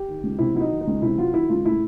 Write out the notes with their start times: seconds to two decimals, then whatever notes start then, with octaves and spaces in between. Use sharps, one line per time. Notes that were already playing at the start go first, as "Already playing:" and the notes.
Already playing: G4
0.08 D#3
0.23 C#2
0.39 C3 E4
0.55 F#3 E4
0.60 D#4
0.71 D#3
0.81 D#4
0.87 C#2
1.02 C3 E4
1.18 F#3 F4
1.34 D#3 E4
1.49 C#2 F4
1.65 A2 E4